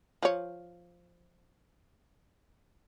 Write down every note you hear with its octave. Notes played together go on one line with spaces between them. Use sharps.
F3 C#5